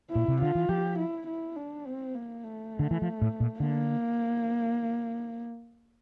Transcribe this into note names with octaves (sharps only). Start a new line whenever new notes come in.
E4
A#2
C3
D3 F4
E3
F3 G4
E4
E4
D4
C4
A#3
A3
D3
E3
F3
A2
A#2
D3 A#3